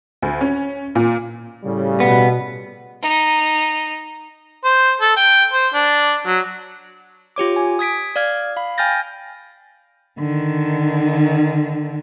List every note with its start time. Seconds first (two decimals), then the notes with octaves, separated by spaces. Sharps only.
0.22 D2
0.41 C#4
0.95 A#2
1.64 A2 C#3 G3
2.00 B2 B3
3.02 D#4
4.65 C5
5.01 A4
5.17 G5
5.53 C5
5.74 D4
6.26 F#3
7.36 F4 G4 C#5 D6
7.56 G#5
7.79 D#6 G#6 B6 D7
8.16 D5 F5 F6 G#6
8.56 F5 B5
8.78 G5 G#5 F6 G6 A6 A#6
10.19 D3 D#3